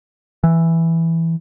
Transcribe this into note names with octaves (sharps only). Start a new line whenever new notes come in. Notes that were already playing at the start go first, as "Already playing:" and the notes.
E3